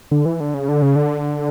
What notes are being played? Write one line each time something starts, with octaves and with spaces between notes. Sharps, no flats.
D3
E3
D3
C#3
D3
C#3
D3